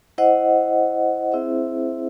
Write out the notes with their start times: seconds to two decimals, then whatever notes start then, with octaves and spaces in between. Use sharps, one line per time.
0.18 E4 C5 D#5 F#5
1.32 C4 E4 G#4 C5 E5